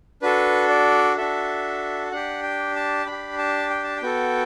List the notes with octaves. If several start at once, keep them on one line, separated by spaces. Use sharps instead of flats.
D4 F#4 A4 B4
D5
D4 F#4 A4 E5
D4 G4 F#5
G5
A5
D4 B5
G4
A5
G5
A5
G5
B3 F#4 A4